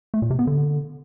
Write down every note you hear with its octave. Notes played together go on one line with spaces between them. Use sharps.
A3
A#2
C3
B3
D3